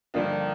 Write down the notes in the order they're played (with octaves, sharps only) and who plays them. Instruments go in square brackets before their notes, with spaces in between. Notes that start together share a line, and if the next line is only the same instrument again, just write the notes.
[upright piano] G2 D3 F3 A#3 D4 [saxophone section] D#3